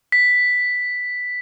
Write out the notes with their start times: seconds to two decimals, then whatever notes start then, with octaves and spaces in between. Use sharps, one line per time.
0.12 B6